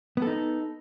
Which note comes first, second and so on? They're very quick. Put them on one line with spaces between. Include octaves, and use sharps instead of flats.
B3 A4 D#4